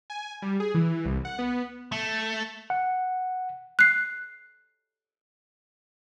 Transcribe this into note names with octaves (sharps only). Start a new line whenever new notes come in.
G#5
G3
G#4
E3
C2
F#5
B3
A3
F#5
F#6 C7